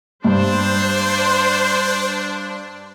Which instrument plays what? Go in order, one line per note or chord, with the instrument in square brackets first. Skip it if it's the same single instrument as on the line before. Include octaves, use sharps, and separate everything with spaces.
[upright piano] G2 [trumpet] D4 [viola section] C5